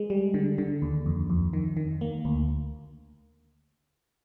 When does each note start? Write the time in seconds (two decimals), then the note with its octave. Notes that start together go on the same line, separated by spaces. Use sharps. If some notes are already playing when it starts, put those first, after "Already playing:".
Already playing: G#3
0.10 G3
0.34 D3
0.58 D3
0.82 D#2
1.06 F2
1.30 F2
1.53 D#3
1.77 D#3
2.01 A#3
2.25 D2